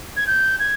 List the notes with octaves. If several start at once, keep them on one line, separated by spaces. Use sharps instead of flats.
G#6
G6
G#6